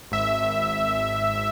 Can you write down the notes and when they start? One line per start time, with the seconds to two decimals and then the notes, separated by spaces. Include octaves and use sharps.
0.12 G#1 E5
0.42 G#1